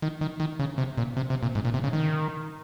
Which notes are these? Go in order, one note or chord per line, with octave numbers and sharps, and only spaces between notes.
D#3
D#3
D#3
C#3
C3
A#2
C3
C3
A#2
G#2
A#2
C3
C#3
D#3